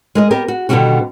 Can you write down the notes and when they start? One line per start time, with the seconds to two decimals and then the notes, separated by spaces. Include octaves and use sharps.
0.15 G#3 A#4 D#5
0.31 B3 G4 A#4
0.48 F#4
0.69 B2 D3 D#3 F3 G3 F#4